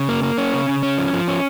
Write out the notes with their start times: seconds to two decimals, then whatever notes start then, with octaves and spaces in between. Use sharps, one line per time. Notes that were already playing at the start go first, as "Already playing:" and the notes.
Already playing: C#3
0.09 A#3
0.23 A#3
0.38 C#4
0.53 C#3
0.69 C#3
0.83 C#4
0.98 F3
1.13 F3
1.28 C#4